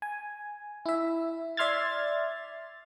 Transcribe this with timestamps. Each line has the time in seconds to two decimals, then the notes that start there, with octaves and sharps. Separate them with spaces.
0.02 G#5
0.86 E4 E5
1.57 D5 E5 C6 F6 G#6 A6